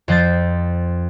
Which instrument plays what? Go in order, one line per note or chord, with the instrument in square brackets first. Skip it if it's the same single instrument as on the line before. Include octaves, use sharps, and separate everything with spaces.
[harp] F2 F3 C5 G6 A6